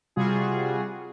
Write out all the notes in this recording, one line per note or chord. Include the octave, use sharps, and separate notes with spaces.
C3 G3 F4 F#4 G#4